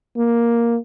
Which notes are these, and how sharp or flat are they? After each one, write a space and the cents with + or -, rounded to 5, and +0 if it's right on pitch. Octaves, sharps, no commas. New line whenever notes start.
A#3 +5